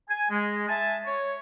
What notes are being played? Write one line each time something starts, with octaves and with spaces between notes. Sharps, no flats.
G#5
G#3
E5 G#5 A5
C#5